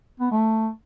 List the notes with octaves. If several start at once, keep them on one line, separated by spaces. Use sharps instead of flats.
B3
A3